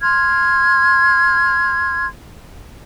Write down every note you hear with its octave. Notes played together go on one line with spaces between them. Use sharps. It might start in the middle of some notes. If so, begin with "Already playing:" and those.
C6 F6 G#6